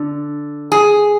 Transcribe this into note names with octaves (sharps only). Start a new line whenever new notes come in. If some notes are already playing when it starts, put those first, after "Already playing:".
Already playing: D3
G#4